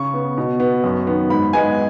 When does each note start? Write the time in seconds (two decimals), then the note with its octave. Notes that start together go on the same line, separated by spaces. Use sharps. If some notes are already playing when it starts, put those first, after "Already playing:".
Already playing: C#3 C#6
0.14 B3
0.37 B2
0.60 B3
0.84 F#2
1.07 D#3 B3
1.30 G#2 B5
1.53 G#3 B3 G#5